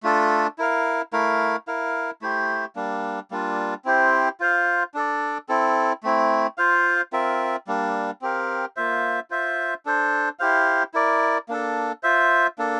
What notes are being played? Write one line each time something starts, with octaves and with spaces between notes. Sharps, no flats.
A3 D4 F4 A4
E4 A#4 F5
A3 E4 A#4 F5
E4 A#4 F5
A3 E4 G4 C5
G3 A#3 D4
G3 A#3 D4 F4
C4 E4 G4 C5
F4 C5 F5
D4 A4 D5
C4 E4 A4
A3 C4 E4
F4 C5 F5
C4 F4 A#4 E5
G3 A#3 D4
C4 G4 A#4 F5
A#3 F4 C5 E5
F4 C5 E5
D4 A4 C5
E4 G4 C5 F5
E4 A#4 D5
A#3 D4 A4
F4 C5 E5
A#3 D4 A4